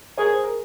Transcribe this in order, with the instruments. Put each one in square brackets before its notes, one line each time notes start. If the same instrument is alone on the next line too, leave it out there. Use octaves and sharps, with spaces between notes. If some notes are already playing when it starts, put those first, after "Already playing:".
[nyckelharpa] G#4 [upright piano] A#4 C#5
[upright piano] C5
A#4